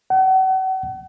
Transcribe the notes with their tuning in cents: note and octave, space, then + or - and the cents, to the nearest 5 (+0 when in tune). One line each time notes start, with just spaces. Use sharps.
F#5 +40